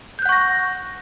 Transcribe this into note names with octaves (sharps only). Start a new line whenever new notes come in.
F#5 C#6 F#6 G6 A#6